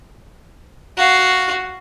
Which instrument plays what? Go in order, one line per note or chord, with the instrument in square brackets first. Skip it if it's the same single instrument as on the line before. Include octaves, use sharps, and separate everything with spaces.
[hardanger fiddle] F#4 F5